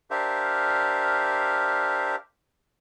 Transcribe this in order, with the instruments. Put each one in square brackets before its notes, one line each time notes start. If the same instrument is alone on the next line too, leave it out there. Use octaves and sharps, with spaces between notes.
[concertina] D4 G4 A#4 C5 E5 F5